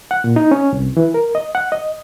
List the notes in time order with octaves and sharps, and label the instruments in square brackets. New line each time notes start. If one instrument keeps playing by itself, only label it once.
[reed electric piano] F#5
A#2
D#4
C#4
C2
E3
A#4
D#5
F#5
D#5